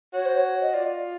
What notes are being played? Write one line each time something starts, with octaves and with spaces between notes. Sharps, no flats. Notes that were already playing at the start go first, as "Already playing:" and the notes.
F#4 C#5
C5
C#5
D#5
F4 D5